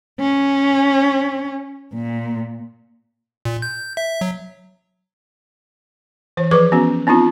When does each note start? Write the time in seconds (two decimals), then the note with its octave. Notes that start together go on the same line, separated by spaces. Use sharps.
0.20 C#4
1.94 A#2
3.45 A#2
3.62 G6
3.97 E5
4.21 F#3
6.37 E3 C5
6.51 F3 G#4 B4 C#6 D6
6.72 B3 C#4 F#4
7.07 B3 C4 D4 D#4 F4